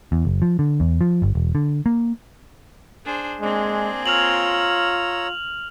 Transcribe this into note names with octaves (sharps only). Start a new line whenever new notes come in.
E2
F#1
F3
D3
E2
F3
G1
E1
D3
A#3
D4 G#4 C5
G#3 A#3 C4 D4 G#4
F4 C#5 A#5 E6 F6 F7 F#7